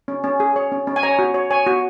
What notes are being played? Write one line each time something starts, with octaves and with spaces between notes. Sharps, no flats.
C#4
C#4
G#4
C#5
C#4
C#4
G#5
C#5 A#5
F#4
C#5
C#5 G#5
F#4